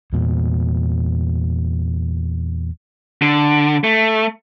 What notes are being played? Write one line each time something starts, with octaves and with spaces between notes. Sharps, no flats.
E2 A#2
D3
A3